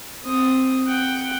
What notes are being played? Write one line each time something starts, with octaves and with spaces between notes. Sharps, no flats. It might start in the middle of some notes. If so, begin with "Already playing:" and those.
C4 D#6
F#5 G5